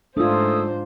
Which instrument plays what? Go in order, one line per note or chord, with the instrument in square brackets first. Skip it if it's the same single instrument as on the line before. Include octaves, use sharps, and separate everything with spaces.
[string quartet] G#2 C5 [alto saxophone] A3 [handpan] D4 F4 [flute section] G#5 D#6 E6